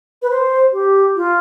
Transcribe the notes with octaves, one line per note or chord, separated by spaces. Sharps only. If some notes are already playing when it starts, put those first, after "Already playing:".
B4
C5
G4
F4